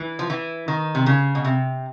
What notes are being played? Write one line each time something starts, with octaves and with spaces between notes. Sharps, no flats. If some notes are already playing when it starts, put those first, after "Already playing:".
Already playing: E3
F3
E3
D#3
C3
C#3
B2
C3